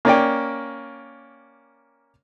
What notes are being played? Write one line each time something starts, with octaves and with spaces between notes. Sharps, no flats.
A#3 C#4 D5 G5